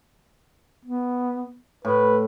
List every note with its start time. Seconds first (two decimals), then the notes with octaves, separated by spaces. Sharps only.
0.85 B3
1.85 A2 B4